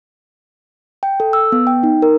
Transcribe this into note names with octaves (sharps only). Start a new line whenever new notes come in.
G5
A4
E6
B3
G5
D#4
A#4